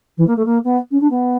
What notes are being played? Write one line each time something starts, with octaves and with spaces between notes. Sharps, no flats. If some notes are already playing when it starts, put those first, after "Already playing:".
E3
A#3
A3
A#3
B3
C#4
D4
B3